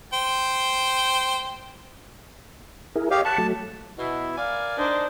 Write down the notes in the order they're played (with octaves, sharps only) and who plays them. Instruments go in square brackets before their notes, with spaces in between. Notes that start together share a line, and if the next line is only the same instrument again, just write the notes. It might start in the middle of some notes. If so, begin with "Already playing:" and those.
[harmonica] C5 G5
[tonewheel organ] E4 G#4 A#4
[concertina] G4 F5 [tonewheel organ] C#5 D#5
[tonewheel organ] F#5 B5 C#6 [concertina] A5
[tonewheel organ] F#3 A3
[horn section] B2 [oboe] E4
[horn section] A#4 D5 G#5 [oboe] F5
[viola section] D4 C5 [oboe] D#4